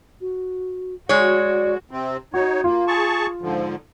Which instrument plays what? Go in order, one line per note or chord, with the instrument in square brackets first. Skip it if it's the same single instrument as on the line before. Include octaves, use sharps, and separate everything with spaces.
[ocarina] F#4
[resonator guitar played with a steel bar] G#3 C#5 [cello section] F#4 [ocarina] D5
[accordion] C3 C4
[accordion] D#4 C#5 [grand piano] F#4
[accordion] A#3 [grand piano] F4
[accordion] G#4 A5 C#6
G#2 D3 F3